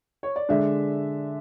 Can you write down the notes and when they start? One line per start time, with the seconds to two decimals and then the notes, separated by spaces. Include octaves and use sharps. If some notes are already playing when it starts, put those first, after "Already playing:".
0.23 C#5
0.36 D5
0.49 D3 G#3 D4 E5